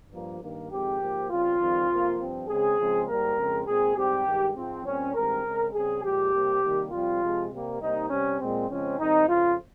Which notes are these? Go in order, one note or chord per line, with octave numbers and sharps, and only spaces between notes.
G2 F3 A#3
G2 D#3 A#3
F2 D#3 G#3 C4 G4
G#2 F3 A#3
C#3 G3 C4 F4
F2 D#3 G3 C4
F2 C3 F3 A#3
G2 F3 C4
C#3 G#3 C4 G#4
C#3 F3 G#3 C4
G#2 G3 A#3 A#4
F2 C#3 G#3 C4
A#2 G#3 C4 G#4
G#2 G3 C4 G4
G2 D#3 G#3
G#2 F3 C4
A#2 G3 C4 C#4
G2 D#3 G#3 C4 A#4
C#3 G#3 C4
C#3 G3 C4 G#4
A#2 F3 G#3 G4
C3 G3 A#3
C3 D#3 G3 A#3
F2 C3 G3 C4 F4
C3 F3 G#3 C4
C3 G3 A#3
C3 G3 A#3 D#4
C3 G3 C4 C#4
A#2 G#3 C4
F2 C#3 F3 G#3 C4 C#4
G#2 D#3 G3 C4 D#4
F2 C#3 F3 F4